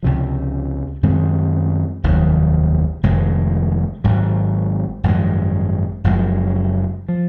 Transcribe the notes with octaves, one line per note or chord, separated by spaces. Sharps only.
C#2 C3 F3
F#2 D#3 G#3 C4
F1 D#2 D#3 F#3
F1 F2 D#3 G#3
G#1 G#2 F#3
G#1 F#2 F3 G#3
F#1 F#2 F3 G#3
F3